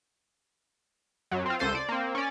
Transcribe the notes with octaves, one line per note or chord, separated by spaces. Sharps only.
F#2 F#3
C4 F4
C#2 A4 C5 D#7
D5
A#3 C4
C#4 D5